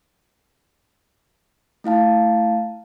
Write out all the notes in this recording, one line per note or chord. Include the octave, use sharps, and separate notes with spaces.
A3 E4 F5 A5